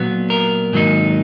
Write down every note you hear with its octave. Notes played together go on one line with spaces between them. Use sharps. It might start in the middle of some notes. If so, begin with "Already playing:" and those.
Already playing: A#2 F#3 B3
A#4
G#2 D#3 F#3 A#3 D#4